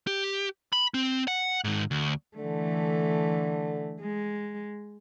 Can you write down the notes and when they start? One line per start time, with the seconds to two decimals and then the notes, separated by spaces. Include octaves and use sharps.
0.07 G4
0.73 B5
0.94 C4
1.28 F#5
1.64 G#2 D#3
1.91 D2
2.37 D3 E3 A3
4.01 G#3